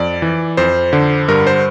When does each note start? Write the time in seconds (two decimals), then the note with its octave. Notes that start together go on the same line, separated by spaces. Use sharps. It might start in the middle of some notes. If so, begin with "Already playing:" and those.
Already playing: F2 D5
0.22 E3
0.57 F2 C5
0.93 D3
1.28 G2 A#4
1.47 C5